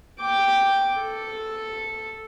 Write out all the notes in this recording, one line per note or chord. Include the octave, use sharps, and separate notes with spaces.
G5 D6
A4